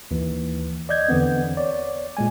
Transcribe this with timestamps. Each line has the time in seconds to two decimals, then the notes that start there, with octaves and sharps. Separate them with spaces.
0.11 D#2 E3
0.89 D5 D#5 G6 G#6
1.09 E2 D3 E3 B3 C4
1.57 C#5 D5
2.17 A#2 G#3 G#5